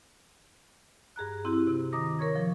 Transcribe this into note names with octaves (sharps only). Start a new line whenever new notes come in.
G2 G#4 A#5 F#6
C4 E4 F#4 G4
C3
D#3 A#5 D6 D#6 A#6
A#4 C#5 C#6 G#6
F3